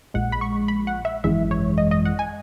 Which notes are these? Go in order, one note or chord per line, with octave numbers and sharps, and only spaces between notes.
A#1 A#2 G#3 F#5
B5
C#6
B5
F#5
E5
G#1 F#2 E3 G#3 E5
C#5
D#5
D#5
F#5
G#5